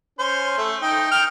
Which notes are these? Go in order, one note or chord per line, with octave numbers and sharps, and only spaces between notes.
C#4 C5
A3
D#4 G5
G5 F6